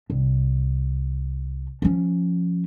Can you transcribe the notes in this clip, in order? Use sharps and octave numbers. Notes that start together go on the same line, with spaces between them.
C2
F3 C#4